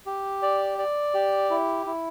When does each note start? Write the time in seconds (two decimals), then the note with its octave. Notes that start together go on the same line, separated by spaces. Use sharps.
0.06 G4
0.42 D5
0.78 D5
1.14 G4
1.50 E4
1.86 E4